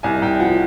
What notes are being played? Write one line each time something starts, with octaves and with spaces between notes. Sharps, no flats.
C2 G#5
C2 G5
F3 F#5